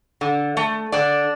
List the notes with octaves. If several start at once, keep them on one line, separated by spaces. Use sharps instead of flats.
D3
A3
D3 D4 D5